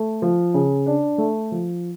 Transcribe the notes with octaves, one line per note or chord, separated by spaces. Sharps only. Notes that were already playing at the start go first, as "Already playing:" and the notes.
Already playing: A3
F3
C#3
D4
A3
F3